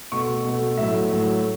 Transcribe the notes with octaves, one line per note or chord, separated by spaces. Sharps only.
B2 A3 C#6
B2 A3
A2 F#3 A3 E5
A2 F#3 A3